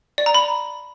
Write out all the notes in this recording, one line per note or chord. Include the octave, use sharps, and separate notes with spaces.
D5
A#5
B5